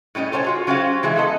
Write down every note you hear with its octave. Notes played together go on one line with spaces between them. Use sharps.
A2 G3 C#4 G4 D#5
A4 C5 C#5 E5 G#5
F4 F#4 G#4
F#3 C#4 F#4 G4 C5 F5
E3 G#3 G#4 E5
B3 A4 D#5